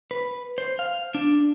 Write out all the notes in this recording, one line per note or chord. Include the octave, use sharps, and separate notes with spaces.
B4
C5
F5
D4